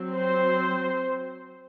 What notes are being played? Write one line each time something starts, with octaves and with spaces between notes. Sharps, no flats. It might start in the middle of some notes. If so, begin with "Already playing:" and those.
Already playing: F#3 C4
C5